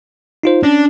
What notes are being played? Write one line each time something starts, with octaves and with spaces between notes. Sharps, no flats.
D#4 F4 C5
C#4 D4